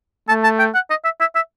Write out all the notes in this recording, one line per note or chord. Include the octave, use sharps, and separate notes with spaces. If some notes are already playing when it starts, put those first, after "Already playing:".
A3 A5
A5
G5
F#5
D#5
E5
E5
E5